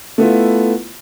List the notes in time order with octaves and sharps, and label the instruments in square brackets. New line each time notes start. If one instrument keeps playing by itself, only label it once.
[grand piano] A3 B3 E4 F4